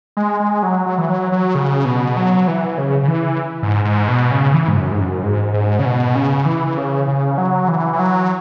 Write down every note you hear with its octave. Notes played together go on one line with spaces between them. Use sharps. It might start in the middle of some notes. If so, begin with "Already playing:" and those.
G#3
G#3
F#3
F#3
E3
F#3
F#3
C#3
B2
F#3
E3
C#3
C#3
E3
G#2
G#2
B2
C#3
E3
G#2
F#2
G#2
F#2
G#2
G#2
C#3
B2
C#3
E3
E3
C#3
C#3
F#3
E3
E3
F#3